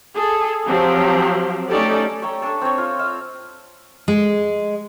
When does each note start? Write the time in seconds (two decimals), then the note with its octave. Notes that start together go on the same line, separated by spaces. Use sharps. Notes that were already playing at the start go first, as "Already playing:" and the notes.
0.14 G#4 A4
0.67 F3 F#3 C4 G4
1.69 A3 C#4 D#4 G4 A4 D5
2.22 C#5 E5 G5 A#5
2.42 D4 A4 G#5 A5
2.61 C4 C#5
2.78 F4
2.99 E5 F5
4.08 G#3